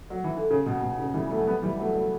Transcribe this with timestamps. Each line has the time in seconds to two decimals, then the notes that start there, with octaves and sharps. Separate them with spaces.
0.10 F#3
0.24 E3
0.37 D3
0.50 C#3
0.66 B2
0.82 B2
0.99 C#3
1.14 E3 G3
1.30 F#3 A3
1.47 G3 B3
1.62 E3 G3
1.79 F#3 A3
1.95 F#3 A3